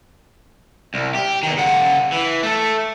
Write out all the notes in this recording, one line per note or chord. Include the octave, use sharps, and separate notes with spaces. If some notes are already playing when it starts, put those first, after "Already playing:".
C2
G4
E2 D#3
C#3 F#5
E3
A3 A4